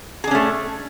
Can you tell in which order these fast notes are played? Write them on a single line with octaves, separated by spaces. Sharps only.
G#4 D4 C#4 A3